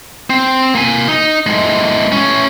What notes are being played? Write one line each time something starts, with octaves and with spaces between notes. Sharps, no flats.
C4
A#3 G#5
D#4
A2 G#3
A2 C#4